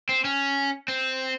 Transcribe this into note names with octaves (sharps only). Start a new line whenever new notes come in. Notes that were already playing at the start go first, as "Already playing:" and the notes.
C4
C#4
C4